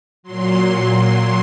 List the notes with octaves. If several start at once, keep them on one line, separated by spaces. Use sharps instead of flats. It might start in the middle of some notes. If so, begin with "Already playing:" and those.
A#2 F#3 C6